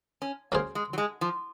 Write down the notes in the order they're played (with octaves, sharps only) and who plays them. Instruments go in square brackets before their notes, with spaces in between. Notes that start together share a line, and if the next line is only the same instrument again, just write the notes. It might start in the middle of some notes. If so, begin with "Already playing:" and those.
[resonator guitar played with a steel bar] C#4
[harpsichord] F#3 C#4 G#4 C5 [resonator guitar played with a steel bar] A#3
[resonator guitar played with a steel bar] G#3
F#3
G#3
F3